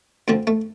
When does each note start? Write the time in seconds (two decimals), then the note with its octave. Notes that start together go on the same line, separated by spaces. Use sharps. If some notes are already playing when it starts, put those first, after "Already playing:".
0.28 D2 D3 F3 C4
0.47 A3